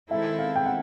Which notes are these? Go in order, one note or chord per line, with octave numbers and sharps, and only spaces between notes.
D#3 G#3 C4 E4 A4 E5
F5
G5
F#5